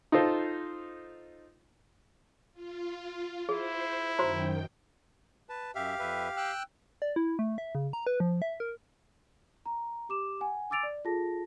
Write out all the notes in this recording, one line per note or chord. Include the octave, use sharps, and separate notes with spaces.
D#4 F4 A4 C5
F4
E4 G#4 C5
F#2 D#3 F#4 C5 G5 A#5
B4 A5
F#2 G4 E5 F5
F2 B4 E5
G5 E6 F#6
D5
E4
A3
E5
C#3
A#5
B4
F3
E5
A#4
A#5
G4 D6 E7
F#5 G#5
G#5 D6 E6 A6 D7 F7
D5
F4 G#4 A4 A5 A#6